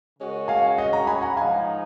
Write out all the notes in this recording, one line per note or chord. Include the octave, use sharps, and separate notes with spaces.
C#3 G#3 C#4 F#4 A#4
F5 G#5
D#5 F#5
A#5 C#6
G#5 B5
F#5 A#5
G#2 F3 G#3 D#4 F5 G#5